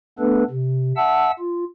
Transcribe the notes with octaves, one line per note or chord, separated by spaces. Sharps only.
A3 B3 D4 A4 B4
C3
E5 F#5 A5 E6
F4